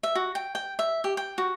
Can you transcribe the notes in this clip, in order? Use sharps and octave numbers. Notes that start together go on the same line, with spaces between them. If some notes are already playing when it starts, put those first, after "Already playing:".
E5
F#4
G5
G5
E5
G4
G5
F#4